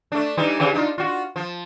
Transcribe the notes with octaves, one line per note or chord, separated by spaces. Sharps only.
A3 D4
E3 G3 D#4
C#3 E3 G4
D4 D#4 F4
F4 F#4
F3